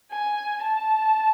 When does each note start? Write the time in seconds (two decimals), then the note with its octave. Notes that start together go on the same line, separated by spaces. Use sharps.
0.12 G#5
0.63 A5